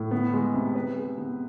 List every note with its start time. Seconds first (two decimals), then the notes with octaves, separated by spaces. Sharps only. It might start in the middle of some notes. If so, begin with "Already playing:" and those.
Already playing: A2
0.11 B3
0.34 G#3
0.54 C3
0.75 B4
0.96 G#4
1.18 B3